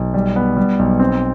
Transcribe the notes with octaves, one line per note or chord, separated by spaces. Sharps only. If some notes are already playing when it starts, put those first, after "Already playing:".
Already playing: B1
G3
B3
G3
B1
C4